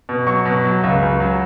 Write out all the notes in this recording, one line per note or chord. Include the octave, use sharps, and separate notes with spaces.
B2
F#3 C#6
B2
F#3
C#2
C#2
F#3